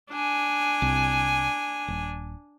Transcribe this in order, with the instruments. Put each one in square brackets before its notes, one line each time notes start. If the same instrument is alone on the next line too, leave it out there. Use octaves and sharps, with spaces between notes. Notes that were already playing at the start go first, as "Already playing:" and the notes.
[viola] D4 G#5
[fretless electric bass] C2
D#1